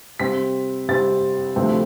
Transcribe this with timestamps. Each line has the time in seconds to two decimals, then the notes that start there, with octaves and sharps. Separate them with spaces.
0.20 C3 G3 C4 B6
0.88 C3 G3 C4 A6
1.56 D2 C3 F3 A3 C4